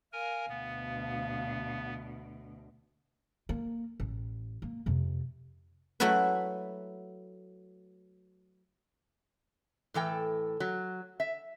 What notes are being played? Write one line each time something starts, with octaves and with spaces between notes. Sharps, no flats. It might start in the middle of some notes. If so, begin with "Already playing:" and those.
A#4 F5 G#5
D2 B2 B3
A#3
A1
A#3
F2 C3
F#3 A3 E4 F#4 B4
A2 E3 A4 G5
F#3
E5